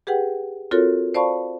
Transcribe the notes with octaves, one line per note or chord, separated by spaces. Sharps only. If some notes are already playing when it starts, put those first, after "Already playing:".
G4 G#4 B4 F#5 G5
C4 F4 F#4 A4 A#4 C#5
C5 D5 F5 A5 B5 C#6